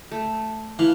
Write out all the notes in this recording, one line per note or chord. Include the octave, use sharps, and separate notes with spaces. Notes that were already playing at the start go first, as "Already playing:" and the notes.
A3
E3 F5